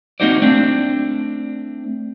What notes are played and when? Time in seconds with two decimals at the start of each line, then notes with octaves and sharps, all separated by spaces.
0.20 A#3 C4 D#4 F#4 C5 D5
0.42 A3 C4 D4